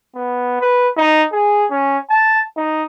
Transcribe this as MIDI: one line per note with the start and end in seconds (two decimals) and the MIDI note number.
0.15 0.56 59
0.61 0.88 71
0.97 1.24 63
1.32 1.65 68
1.71 1.98 61
2.10 2.42 81
2.57 2.85 63